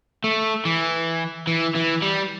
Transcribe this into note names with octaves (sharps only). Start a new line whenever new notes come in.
A3
E3
E3
E3
G3